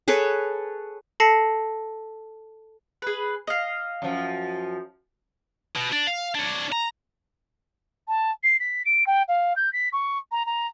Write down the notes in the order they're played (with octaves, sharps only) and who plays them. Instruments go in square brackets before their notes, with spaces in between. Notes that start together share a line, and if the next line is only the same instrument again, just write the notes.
[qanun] G#4 A4 B4 C#5
[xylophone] A4 A5 A#6 C7 C#7
[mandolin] G#4 B4
D#5 F5
[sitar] F#2 F3
[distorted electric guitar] B2
D4
F5
D4 C#5
A#5
[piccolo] A5
C7
B6
D7
G5
F5
G6
B6
C#6
A#5
A#5